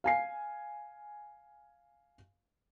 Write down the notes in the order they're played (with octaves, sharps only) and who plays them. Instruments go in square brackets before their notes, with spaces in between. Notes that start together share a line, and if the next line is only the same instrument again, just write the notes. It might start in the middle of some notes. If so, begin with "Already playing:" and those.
[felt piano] F5 G#5 C7